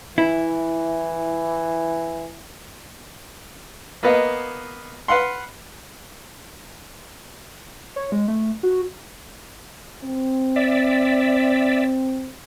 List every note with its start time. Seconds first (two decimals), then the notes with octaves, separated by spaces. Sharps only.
0.18 E3 E4
4.03 A#3 B3 B4 D#5 F5
5.08 B4 F5 F#5 C6
7.96 C#5
8.12 G#3
8.28 A3
8.63 F#4
10.04 C4
10.56 D5 E5